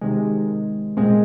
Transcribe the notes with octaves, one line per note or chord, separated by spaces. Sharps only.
C3 D#3 G#3
A#2 G#3 C4